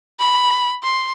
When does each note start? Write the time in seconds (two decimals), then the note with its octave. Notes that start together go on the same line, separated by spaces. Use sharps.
0.20 B5
0.83 C6